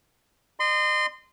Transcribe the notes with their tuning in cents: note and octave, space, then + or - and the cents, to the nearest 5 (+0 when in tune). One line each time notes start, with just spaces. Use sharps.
D#5 -35 C6 -20